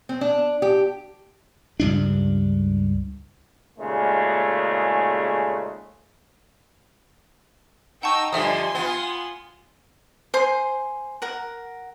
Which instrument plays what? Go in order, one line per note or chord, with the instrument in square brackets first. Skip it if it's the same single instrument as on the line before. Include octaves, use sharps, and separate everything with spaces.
[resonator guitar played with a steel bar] C4
D4
G4
[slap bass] C#2 G2 D4
[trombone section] D#2 A#2 C#3 G#3 A3
[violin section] D#4 G5 E6 [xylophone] F#5 A5 C#6
[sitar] G2 D3 F3 [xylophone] D#5 E5 D#6 [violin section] G#5 C6
[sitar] B3 F4
[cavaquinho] C5 G#5 C6
A#4 F#5